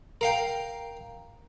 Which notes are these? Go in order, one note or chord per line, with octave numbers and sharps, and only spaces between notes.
A#4 F5 G5